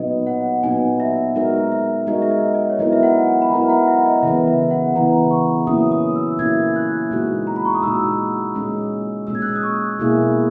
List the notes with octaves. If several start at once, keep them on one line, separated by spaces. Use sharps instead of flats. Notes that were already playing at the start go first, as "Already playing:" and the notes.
Already playing: A#2 F#3 B3 D#4 D#5
F#5
A#2 F#3 B3 D#4 G#5
E5
G#3 D#4 F#4 A#4 E5
E5
G#3 D#4 F#4 A#4 D#5
E5
D#5
D#5
C#5
F#3 B3 E4 A#4 D#5
E5
F#5
G#5
B5
F#3 B3 E4 A#4 A#5
F#5
E5
D#5
C#3 E3 B3 E5
E5
F#5
C#3 E3 B3 A#5
C#6
A#2 F#3 A#3 C#4 E4 D#6
D#6
E6
A#2 F#3 A#3 C#4 E4 G#6
F#6
A#2 G#3 D#4 F#4
A#5
B5
C#6
D#6
A#2 G#3 D#4 F#4 E6
A#2 G#3 C#4
A#2 G#3 C#4 E6
G#6
F#6
E6
D#6
C#6
B2 A#3 E4 G#4